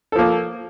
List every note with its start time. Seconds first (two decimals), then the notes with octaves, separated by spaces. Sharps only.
0.12 A4
0.15 F3
0.19 A#3